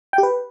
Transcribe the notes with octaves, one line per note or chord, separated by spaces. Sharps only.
G5
G4
B4